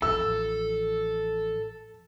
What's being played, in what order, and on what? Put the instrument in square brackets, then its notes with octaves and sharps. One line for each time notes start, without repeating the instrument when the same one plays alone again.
[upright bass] A1 F3 [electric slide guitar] A4 [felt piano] E6